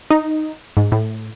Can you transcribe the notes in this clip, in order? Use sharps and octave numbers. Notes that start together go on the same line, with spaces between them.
D#4
G#2
A2